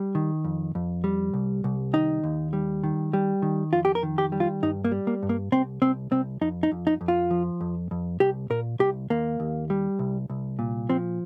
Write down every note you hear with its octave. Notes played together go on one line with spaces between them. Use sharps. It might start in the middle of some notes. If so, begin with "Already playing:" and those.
Already playing: G3
D#3
F2
F2
G3
C2
C2
D#3 D#4
D#2
G3
D#3
G3
D#3
F2 F4
G4
A#4
D#3
G4
G3
F4
G2 D#4
A#3
G3
A#3
G2
A#3
C2 C4
C2 C4
C2 C4
F2 D#4
D#4
F2
D#4
F2
F4
F3
F2
F2
C2 G4
A#2 A#4
C2 G4
D#2 A#3
D#2
G3
C2
C2
A#2
F3 C4